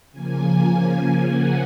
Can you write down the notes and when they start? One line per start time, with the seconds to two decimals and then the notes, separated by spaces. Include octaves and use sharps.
0.12 C#3 F3 A#3 G#5
1.00 G#5
1.29 F#5